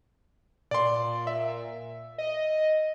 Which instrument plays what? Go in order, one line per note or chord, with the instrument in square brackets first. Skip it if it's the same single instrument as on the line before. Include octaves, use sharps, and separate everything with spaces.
[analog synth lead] A#2 [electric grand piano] D5 C6
[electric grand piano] E5
[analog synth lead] D#5